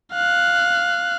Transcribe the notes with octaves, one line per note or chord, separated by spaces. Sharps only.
F5 F#6